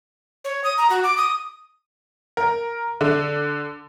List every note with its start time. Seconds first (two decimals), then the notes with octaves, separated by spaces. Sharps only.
0.44 C#5
0.64 D#6
0.78 A#5
0.90 F#4
1.04 D6
1.17 D#6
2.37 A#4
3.01 D3